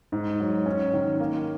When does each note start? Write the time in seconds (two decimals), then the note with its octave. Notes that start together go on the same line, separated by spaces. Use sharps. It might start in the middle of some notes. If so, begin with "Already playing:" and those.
0.12 G#2
0.40 F#3
0.66 C#4
0.94 D#3
1.20 A#3